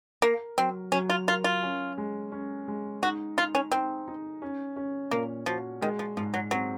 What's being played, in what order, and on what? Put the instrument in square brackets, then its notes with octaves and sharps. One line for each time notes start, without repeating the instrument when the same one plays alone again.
[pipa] A#3 [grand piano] A#4
[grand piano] F#3 [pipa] C4
[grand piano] F#3 [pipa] C#4
[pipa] F4
[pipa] F4 [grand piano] A#4
[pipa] F4
[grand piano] C#4
G#3
C#4
G#3
[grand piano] D#4 [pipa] F#4
[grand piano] D#4 [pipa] F4
[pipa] C#4
[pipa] C4 [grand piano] D#4
[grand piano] D#4
C#4
C#4
[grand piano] A#2 [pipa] A#3
[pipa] F3 [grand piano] F#4
[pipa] D#3 [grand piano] G#3
[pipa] F3
[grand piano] G#2 [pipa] F3
[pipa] F#3
[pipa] F#3 [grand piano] C4